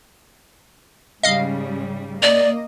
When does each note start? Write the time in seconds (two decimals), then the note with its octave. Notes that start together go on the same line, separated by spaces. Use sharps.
1.23 G#2 C#3 G3 D#5 F5
2.23 A#3 D5 D#5